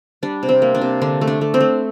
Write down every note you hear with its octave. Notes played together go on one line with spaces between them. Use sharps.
G3 D4
C3
C4
A#3
D4
C3
D3 D4
A3
D4
A3
C4
A3